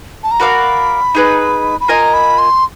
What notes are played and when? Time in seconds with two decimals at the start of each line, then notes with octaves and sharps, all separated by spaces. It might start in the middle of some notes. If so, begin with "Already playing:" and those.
0.24 A5
0.31 A#5
0.40 F#4 A#4 D5 F5 B5
1.15 D#4 G#4 B4
1.80 B5
1.88 F4 A#4 D#5 G#5 A#5
2.13 B5
2.38 C6